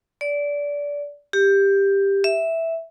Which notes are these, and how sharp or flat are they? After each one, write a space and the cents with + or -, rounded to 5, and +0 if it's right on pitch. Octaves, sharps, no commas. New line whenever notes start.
D5 -20
G4 +10
E5 -5